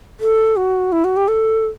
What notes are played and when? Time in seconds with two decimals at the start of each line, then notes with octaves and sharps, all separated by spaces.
0.20 A4
0.56 F#4
0.92 E4
1.04 F#4
1.17 G4
1.28 A4